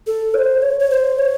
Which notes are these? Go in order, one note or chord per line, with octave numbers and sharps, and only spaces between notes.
A4
C#5
C5
C#5
C#5
C5
C#5